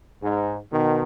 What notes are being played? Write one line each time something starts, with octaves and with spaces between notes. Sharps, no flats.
G#2
B2 D#3